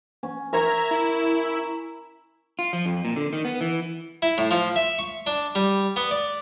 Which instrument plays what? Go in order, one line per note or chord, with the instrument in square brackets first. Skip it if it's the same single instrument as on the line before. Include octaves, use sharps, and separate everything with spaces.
[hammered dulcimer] C#4
[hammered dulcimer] A#4 C#5 [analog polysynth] E5 A#5 G#6
[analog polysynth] E4 E6
[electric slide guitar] F4
F3
F2
A#2
D3
D#3
B3
E3
[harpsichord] E4
A2
F3
E5
C#6
D4
G3
B3
D5